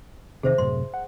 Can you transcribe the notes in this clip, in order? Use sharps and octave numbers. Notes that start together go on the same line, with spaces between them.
E2 C3 D#3 G#4 C5 E5
F#2 A2 C3 C6
F#5